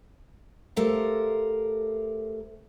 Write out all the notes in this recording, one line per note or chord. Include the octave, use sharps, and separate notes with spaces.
A3 G4 A4 A#4 C5 F5